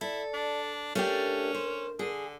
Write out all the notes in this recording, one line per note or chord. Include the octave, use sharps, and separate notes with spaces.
E4 A4 D5
D4
A3 C#4 D4 G4 A#4
C5
D3 G#4